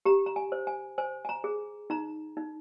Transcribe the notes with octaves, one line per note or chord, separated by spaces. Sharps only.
G4 A#5
A#5
G#5
C5
G#5
C5 G#5
G#5
A#5
G#4
D#4 A#5
D#4